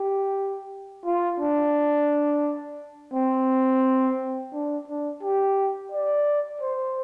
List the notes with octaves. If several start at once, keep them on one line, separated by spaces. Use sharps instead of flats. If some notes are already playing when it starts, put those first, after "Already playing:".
Already playing: G4
F4
D4
C4
D4
D4
G4
D5
C5